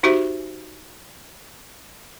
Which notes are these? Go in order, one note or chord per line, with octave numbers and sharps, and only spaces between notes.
D#4 F#4 G4 C5 E5